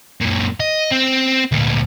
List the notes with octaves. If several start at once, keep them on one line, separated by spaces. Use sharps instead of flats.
F#2 A#2
D#5
C4
D2 A#2